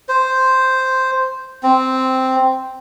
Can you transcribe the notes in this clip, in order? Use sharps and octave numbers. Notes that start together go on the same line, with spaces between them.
C5
C4